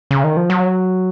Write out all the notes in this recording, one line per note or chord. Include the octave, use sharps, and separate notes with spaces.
C#3
D#3
F3
F#3